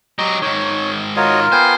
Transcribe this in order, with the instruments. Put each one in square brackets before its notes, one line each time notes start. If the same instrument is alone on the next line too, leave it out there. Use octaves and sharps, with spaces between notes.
[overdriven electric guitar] F#3 G4 [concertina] D#5 A#5
[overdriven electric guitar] G#2 D#3 [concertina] C#5
[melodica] F4 A#4 [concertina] F#4 C#5 D#5
[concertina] B3 G5 G#5 [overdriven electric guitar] C5